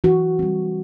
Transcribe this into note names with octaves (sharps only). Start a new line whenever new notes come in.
E3 F#4
G3 C4